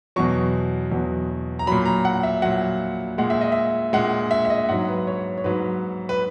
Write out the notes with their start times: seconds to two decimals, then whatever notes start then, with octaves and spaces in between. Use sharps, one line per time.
0.16 E2 B2 F#3 C#6
0.92 E2 B2 F#3
1.59 A#5
1.67 A#2 F#3 B5
1.86 A#5
2.05 F#5
2.23 E5
2.42 A#2 F#3 F#5
3.18 A#2 G#3 F#5
3.30 E5
3.41 D#5
3.52 E5
3.93 A#2 G#3 F#5
4.31 E5
4.45 E5
4.50 D#5
4.69 G#2 F#3 F#5
4.88 B4
5.07 C#5
5.37 C#5
5.44 G#2 F#3 B4
6.09 B4